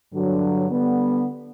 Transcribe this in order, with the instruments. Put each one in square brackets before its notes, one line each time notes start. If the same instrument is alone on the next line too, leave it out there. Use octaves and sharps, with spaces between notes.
[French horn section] G2 D3 F#3
D3 G3 B3